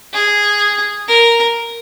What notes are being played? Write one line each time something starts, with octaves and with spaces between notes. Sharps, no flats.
G#4
A#4